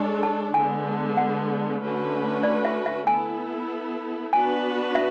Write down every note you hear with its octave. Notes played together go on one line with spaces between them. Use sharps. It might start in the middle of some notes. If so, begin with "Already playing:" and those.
Already playing: G#3 D4 A4 C#5
A5
D3 G#3 B3 G#5
F#5
D3 A3 C#4 F#4 B4
D5
E5
E5
B3 E4 A4 G#5
B3 D4 F#4 B4 G#5
E5